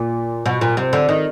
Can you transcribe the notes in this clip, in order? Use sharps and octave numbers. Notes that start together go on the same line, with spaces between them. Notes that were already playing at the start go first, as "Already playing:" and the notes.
Already playing: A#2
B2
A#2
C3
D3
D#3